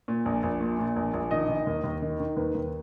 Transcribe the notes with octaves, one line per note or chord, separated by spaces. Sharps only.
A#2
A#1
A#1
A#2
A#2
A#1
A#1
D#3 D#5
D#3
D#2
D#2
D#3
D#3
D#2 B4
D#2